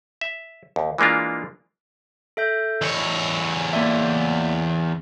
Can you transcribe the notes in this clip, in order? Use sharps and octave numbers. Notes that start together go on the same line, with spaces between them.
E5
D#2
E3 G#3 A#3 D4 F4
A4 E5 G6
E2 C#5 D#5 E6
A#3 D5 E5